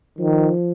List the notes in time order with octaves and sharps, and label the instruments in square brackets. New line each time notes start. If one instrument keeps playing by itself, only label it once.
[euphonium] D#3 [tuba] F3